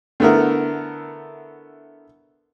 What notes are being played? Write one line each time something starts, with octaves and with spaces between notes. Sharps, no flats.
D3 A3 B3 E4 A#4